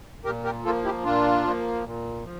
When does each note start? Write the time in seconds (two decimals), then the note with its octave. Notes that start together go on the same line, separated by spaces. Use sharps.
0.25 A#2 G4 A#4
0.45 G4 A#4
0.64 F3 A#3 F4 A4
0.84 E4 G4
1.04 A#2 D4 F4
1.44 F3 A#3
1.84 A#2
2.24 F3